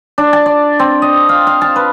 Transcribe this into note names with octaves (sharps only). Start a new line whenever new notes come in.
D4
A5
D5
C4
D#5
F5
F5
A5
B4